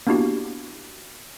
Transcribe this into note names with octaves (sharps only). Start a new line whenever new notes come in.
A#3 B3 D4 E4 F#4 G4